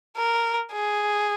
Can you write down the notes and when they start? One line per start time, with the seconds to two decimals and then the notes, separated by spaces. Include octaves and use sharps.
0.17 A#4
0.73 G#4